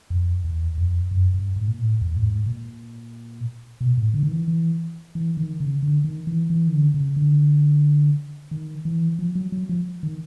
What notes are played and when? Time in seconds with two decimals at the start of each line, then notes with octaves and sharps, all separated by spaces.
0.10 F2
0.44 E2
0.78 F2
1.11 F#2
1.34 G2
1.56 G#2
1.67 A#2
1.79 A2
2.01 E2
2.17 A2
2.24 G#2
2.46 A#2
3.81 B2
3.97 A2
4.14 D3
4.23 D#3
4.31 E3
4.48 E3
5.15 E3
5.37 D#3
5.60 C#3
5.83 D3
6.04 D#3
6.27 E3
6.50 E3
6.67 D#3
6.73 D3
6.94 C#3
7.16 D3
8.51 D#3
8.85 E3
9.19 F3
9.35 F#3
9.52 F#3
9.69 F3
10.03 D#3